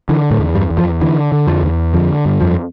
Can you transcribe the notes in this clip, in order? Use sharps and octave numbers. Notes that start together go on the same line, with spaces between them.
D3 E3
A2 A3
E2
G2 G3
E2
F2 F3
D3 E3
D3
F2 F3
E2
F2 D3 F3
G2
F2 F3